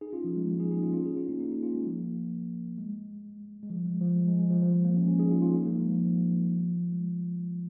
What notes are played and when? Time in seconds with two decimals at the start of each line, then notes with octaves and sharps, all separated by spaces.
0.01 D#4 G#4
0.13 C#4 F4
0.24 F3
0.36 G#3
0.47 F3 A#3
0.60 D#4 G#4
0.71 D#4 G#4
0.82 C#4 F4
0.93 C#4 F4
1.06 D#4 G#4
1.17 C#4 F4
1.28 A#3 D#4
1.40 A#3 D#4
1.51 D#4 G#4
1.63 C#4 F4
1.74 G#3
1.85 F3 A#3
2.78 G#3
3.63 G#3
3.70 F3
3.86 G#3
4.01 F3
4.16 G#3
4.28 G#3
4.39 G#3
4.50 F3
4.62 F3
4.74 G#3
4.84 F3 A#3
4.97 G#3 C#4
5.08 G#3 C#4
5.19 D#4 G#4
5.31 C#4 F4
5.42 C#4 F4
5.54 A#3 D#4
5.66 F3 A#3
5.77 G#3
5.89 F3
6.05 F3
6.93 G#3